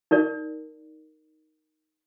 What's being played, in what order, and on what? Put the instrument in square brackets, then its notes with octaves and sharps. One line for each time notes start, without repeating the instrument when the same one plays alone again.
[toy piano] D#4 A#4 D5